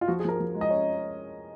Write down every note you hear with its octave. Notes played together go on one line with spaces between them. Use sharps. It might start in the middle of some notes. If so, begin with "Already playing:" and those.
F4
F3 F#4
G#4
F3 A#4
F3
G#3
D#5
C#4 C#5